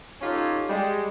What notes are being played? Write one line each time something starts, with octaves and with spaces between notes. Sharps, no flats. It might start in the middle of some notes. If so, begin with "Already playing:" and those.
C#4 D#4 F4 G4 A4
G3 G#3